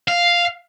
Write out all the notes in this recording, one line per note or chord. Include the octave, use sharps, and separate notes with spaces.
F5